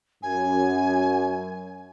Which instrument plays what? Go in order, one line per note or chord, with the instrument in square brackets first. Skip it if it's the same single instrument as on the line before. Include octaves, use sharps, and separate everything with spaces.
[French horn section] F#2 [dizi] G#5